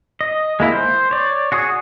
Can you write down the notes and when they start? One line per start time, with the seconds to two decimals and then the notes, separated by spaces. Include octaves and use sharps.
0.21 D#5
0.60 G#3 A#3 E4
0.72 C5
1.11 C#5 D5
1.52 F#4 G#4 C#6 D#6